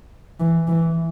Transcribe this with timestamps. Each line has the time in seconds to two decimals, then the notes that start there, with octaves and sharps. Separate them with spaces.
0.40 E3
0.68 E3